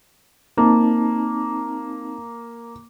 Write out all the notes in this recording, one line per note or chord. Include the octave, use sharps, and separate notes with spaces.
A#3 C4 D#4 A5